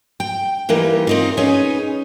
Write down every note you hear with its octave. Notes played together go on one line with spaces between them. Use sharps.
G5
E3 G3 A#3 D#4
C4 D#4 F4
C#4 D#4 G#4 B4